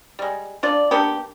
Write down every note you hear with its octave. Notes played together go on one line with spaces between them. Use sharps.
G3 G#3
D4 F4 D5
A#3 B3 D4 G4